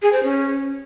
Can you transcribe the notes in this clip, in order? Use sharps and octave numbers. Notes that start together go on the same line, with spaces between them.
G#4
C5
C#4